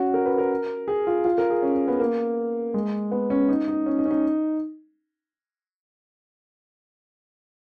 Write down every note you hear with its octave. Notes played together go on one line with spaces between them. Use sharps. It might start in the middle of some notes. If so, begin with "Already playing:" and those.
Already playing: C#4 F#4
A#4
B4
A#4
G#4
F4
F4
A#4
G#4
C#4
C#4
B3
A#3
G#3
B3
C#4
D#4
D#4
C#4
D#4
C#4
D#4